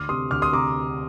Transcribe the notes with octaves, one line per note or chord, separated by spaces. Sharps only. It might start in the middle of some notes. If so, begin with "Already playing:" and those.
Already playing: D2 D6 F6
C3 C6 D#6
D2 D6 F6
C6 D#6
C3 A#5 D6